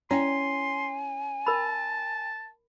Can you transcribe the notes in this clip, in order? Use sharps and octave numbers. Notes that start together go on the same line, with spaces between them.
C#4 E4 G5 G#5 C6
A#4 A5 B5